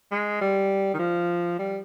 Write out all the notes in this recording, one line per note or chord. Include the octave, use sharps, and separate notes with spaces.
G#3
G3
D#3
F3
G3